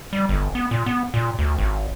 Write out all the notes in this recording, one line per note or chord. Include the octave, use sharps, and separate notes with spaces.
G3
G1
B3
A#2
B3
A#2
D2
G#1